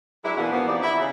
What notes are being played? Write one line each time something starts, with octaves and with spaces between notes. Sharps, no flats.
F#3 G#3 D4 E4
B2 E3 A#3 D4 F#4 F#5
G#2 F3 A#3 B3
F2 E3 D#4 G4 D5
E4
C#3